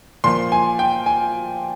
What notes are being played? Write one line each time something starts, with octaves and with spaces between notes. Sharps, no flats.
A#2 F3 C6
G#5
G5
G#5